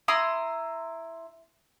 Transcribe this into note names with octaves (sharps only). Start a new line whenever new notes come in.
E4 A#5 C6 D#6